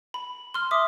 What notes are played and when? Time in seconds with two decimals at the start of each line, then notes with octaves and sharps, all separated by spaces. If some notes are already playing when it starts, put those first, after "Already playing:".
0.14 B5
0.54 C6 F6
0.71 E5 D6 D#6